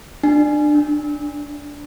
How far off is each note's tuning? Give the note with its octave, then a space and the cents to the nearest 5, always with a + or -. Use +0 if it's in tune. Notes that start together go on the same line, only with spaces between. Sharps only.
D4 +25
D4 -15